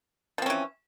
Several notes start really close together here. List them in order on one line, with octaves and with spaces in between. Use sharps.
F3 C4 C#4 E3